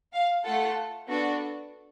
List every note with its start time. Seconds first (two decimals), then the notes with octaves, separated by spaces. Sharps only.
0.13 F5
0.44 A3 F4 A4 F#5
1.07 B3 D4 F#4 A4